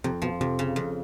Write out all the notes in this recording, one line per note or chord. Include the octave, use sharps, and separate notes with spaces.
F2 C3
B2 F3
F2 C3
C#3
F2